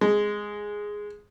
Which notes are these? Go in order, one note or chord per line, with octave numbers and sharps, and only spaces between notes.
G#3